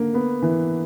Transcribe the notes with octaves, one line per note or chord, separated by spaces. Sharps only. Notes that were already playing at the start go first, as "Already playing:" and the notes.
Already playing: D3 A#3
B3
E3